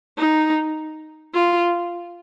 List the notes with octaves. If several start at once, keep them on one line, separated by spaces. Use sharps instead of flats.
D#4
F4